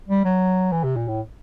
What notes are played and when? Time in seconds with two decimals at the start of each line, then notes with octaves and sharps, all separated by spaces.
0.08 G3
0.25 F#3
0.72 E3
0.84 C3
0.96 A#2
1.08 A2